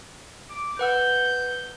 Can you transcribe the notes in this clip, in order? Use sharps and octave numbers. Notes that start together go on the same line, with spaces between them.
D6
B4 F#5 E6 G6